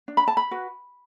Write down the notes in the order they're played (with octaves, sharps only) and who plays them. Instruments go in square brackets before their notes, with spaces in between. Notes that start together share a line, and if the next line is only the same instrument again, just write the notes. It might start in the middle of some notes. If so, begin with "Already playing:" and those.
[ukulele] D4
B5
A5
B5
F#4 B4